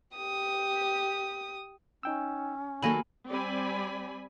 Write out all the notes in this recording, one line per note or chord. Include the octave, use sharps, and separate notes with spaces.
G4 D#6
C#4 D#4 G5 E6
D#3 F#3 A#3 A4 G#5 B5
G3 C4 D5 G#5 B5